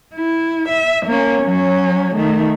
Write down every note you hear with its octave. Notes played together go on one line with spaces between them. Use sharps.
E4
E5
A#3 C#4
F#3 C#4
D#3 A3